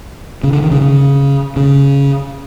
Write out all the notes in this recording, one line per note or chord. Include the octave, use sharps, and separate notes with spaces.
C#3
D3
D#3
C#3
C#3
C#3